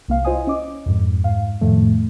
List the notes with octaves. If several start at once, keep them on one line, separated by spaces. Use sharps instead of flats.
C2 A#3 F5
E4 F4 C5 D#5 G#5 D#6
C#4 D#5 D6
F2 G#2
G#2 F5
F2 A2 D#3 F3 A3